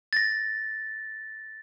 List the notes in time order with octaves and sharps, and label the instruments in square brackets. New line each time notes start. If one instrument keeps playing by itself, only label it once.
[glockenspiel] A6 A#6